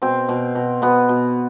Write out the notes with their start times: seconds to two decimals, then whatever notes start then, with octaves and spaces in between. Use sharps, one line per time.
0.02 B2 C4
0.29 B2
0.55 B2
0.82 B2 B3
1.09 B2